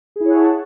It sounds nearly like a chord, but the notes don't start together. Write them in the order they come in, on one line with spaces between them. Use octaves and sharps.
G#4 E4 C#5 F#5 A5